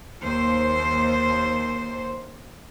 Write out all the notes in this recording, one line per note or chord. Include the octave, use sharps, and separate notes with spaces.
D#2 C5